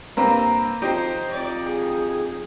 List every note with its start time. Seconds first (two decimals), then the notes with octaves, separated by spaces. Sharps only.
0.17 G2 A#3 C4 B4 A#5
0.82 F2 D#4 G4 C5
1.32 F2 D5
1.63 G#4